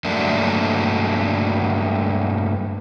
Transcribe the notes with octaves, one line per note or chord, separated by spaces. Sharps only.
G2 F#3 A3 A#3 D4